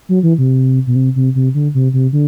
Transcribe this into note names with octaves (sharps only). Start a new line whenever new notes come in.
F#3
E3
C3
B2
C3
C3
C3
D3
C3
C3
D3